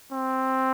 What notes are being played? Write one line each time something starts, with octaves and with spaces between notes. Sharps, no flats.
C4